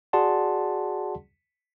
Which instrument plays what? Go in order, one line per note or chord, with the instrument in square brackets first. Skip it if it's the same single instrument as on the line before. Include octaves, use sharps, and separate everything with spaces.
[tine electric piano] F#4 G#4 D5 F#5 A5 C6